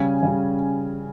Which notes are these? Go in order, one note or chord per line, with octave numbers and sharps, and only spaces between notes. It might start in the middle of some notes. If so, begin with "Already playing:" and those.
Already playing: C#3 G3 C#4 G#5
C#3 G3 C#4